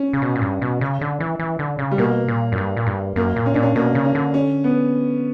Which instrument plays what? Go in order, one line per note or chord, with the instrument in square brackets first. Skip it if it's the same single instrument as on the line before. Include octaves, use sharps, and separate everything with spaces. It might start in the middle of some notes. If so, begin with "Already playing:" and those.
Already playing: [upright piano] C#4
[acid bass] C#3
B2
A#2
G2
B2
C#3
D3
E3
E3
D3
C#3
[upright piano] G3
[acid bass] B2 [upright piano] A#3
[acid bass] A#2
F#2
G2
A#2
G2
[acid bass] F#2 [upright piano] A#3
[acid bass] A#2
[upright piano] C#4
[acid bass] A#2 [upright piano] D4
[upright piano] C#4
[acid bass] B2 [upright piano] A#3
[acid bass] C#3
[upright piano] C#4
[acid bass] D3
[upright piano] C#4
B3